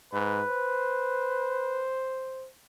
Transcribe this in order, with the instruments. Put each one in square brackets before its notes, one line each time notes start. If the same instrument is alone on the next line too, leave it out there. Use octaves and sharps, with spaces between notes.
[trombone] G#2 [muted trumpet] B4
[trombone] C5